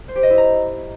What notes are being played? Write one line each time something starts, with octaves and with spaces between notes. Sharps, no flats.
C5
G4
D#5
E4
A#5